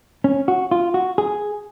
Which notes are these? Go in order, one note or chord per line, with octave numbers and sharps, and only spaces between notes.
C#4
F#4
F4
F#4
G#4